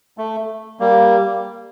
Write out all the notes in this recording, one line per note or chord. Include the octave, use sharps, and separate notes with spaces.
A3
G3 A#3